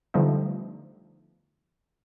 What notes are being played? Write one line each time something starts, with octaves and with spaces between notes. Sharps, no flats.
D3 F3 G3 A3 B3 D#4